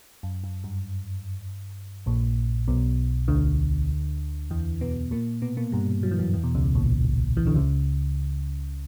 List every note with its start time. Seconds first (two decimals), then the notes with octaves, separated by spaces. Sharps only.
0.23 F#2
0.44 F#2
0.64 G2
2.06 A#1 A#2
2.68 B1 B2
3.28 D2 D3
4.50 E2 E3
4.81 B2 B3
5.11 A#2 A#3
5.42 B2 B3
5.57 A#2 A#3
5.72 G2 G3
6.03 F#3
6.11 E3
6.19 F#2 F#3
6.33 E2 E3
6.43 B2
6.55 C#2 C#3
6.75 A#1 A#2
7.37 E3
7.47 D3
7.55 C#2 C#3